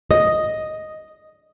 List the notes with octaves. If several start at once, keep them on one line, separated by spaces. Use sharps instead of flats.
D#5